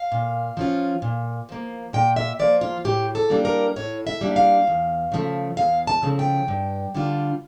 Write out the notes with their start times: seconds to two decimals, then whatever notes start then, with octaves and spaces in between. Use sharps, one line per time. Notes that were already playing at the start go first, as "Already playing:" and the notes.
Already playing: F5
0.12 A#2
0.57 F3 C#4 F4
1.02 A#2
1.49 F3 A#3
1.93 A#2 G5
2.16 E5
2.39 F3 A#3 D5
2.61 F4
2.85 A2 G4
3.15 A4
3.30 G3 A#3 D4
3.45 A#4
3.76 A2 C#5
4.07 E5
4.21 G3 A#3 D4
4.36 F5
4.67 E2
5.12 C#3 F3 A3
5.57 E2 F5
5.87 A5
6.03 C#3 F3 A3
6.19 G5
6.48 G2
6.95 D3 G3 D4 F4